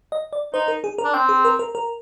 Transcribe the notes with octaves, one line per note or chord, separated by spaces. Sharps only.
D#5
D5
D#4 C5
A#4
G#4
A#4
D4
C4 G5
G#4
A#4
A#4
A#4